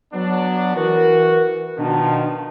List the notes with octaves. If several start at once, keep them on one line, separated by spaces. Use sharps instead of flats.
F#3 B3 D4
E3 F#4 A#4
B2 D#3 F3 D4